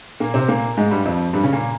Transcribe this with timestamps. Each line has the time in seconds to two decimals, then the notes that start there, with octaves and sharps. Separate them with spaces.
0.20 A#2 A#3
0.34 C3 C4
0.48 A#2 A#3
0.77 G#2 G#3
0.91 G2 G3
1.05 F2 F3
1.33 G2 G3
1.43 C#3 C#4
1.53 A#2 A#3